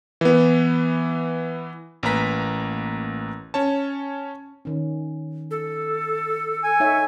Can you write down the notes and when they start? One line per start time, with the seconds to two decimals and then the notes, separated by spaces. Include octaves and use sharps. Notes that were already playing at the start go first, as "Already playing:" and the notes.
0.21 E3 B3
2.03 A1 A#3 B4 A#5 B6
3.54 C#4 C#5 A5
4.65 D#3 C#4
5.51 A4
6.63 G#5
6.80 D#4 C#5 E5